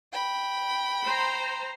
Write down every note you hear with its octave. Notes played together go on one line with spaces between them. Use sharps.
G5 B5
C5 A#5